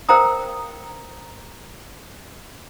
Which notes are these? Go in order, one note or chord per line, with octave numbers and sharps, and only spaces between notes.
A#4 C5 F5 G5 A#5 D#6